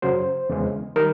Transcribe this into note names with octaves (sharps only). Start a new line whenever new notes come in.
F#2 C#3 F#3 C5
E2 C#3 E3 G#3
D#3 G3 A#4